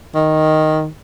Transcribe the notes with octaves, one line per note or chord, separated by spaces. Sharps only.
D#3